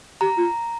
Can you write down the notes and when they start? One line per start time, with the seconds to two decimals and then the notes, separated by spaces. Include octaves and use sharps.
0.21 G4 A#5
0.37 F4